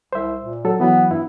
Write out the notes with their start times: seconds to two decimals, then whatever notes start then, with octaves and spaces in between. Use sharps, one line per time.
0.13 C2 C5 E5
0.40 A#2
0.65 F#3 A4
0.80 E3 F#3 B3
1.11 G2 E4